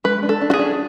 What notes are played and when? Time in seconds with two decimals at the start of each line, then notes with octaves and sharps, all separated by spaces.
0.04 G#3 B4
0.23 D4
0.29 A4
0.41 D4
0.50 F#4
0.54 G#4
0.59 D4